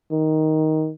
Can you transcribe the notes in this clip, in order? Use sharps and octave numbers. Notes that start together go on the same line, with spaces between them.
D#3